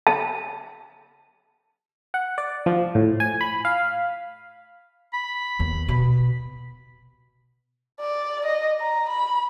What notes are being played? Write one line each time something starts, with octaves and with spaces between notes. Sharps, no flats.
A5
F#5
D5
F3
A2
G#5
B5
F5
B5
D#2 B3
B2
D5
D#5
A#5
B5